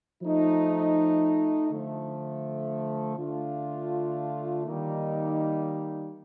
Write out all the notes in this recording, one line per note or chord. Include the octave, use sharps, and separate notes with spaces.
F3 A3 D#4
D3 F3 A3
D3 A3 D4 F4
D#3 G3 A#3 D#4